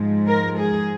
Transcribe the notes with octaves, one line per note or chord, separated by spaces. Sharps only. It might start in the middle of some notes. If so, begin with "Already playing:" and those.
Already playing: G#2 F3 G#3
A#4
G#4